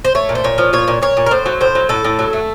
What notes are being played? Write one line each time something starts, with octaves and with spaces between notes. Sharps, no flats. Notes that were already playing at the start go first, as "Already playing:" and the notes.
C5
A3 C#5
A#2
C5
A#2 C#5
F3
A#2 C#5
A#2
A#2 C#5
A#2
A#4
A2 C5
F#3
A2 C5
F#3
A2 A4
A2
F#3
A3